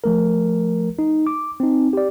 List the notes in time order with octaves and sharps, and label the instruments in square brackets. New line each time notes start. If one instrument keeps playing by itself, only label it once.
[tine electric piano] F3 A3 A#4
D#4
D6
C4 D#4
G4 D5